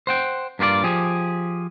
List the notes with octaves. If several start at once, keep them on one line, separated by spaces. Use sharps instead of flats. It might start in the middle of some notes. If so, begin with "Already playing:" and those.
C5 F#5 G5
G2 A#3 F4 G4 D5
F3 G4 G#4